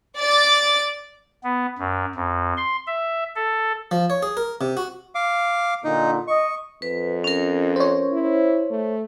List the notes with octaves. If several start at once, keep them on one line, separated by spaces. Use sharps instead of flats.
D5 D6 A6
B3
F#2
F2
C6
E5
A4
F3
C#5
G#4
A#4
C3
F#4
F5 D6
A#2 D3 D#4
D#5 C#6
F2 B4
C#4 A#4
C5 C#5
E4
A3